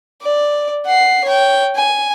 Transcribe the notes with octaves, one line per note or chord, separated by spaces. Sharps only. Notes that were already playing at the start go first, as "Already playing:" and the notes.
D5
F#5 C7
C#5 G5
G#5